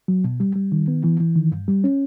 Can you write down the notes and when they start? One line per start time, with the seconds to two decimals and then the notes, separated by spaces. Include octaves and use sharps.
0.08 F#3
0.24 B2
0.40 G3
0.55 G3
0.72 D#3
0.88 B3
1.04 E3
1.20 E3
1.36 D#3
1.52 G2
1.68 G3
1.84 C#4